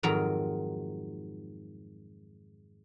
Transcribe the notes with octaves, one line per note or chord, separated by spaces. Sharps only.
F2 G#2 D#3 F#3 A#4 A#5